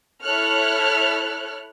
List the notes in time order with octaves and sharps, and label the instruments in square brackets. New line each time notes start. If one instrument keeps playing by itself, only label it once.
[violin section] E4 A4 C#5 F6 F#6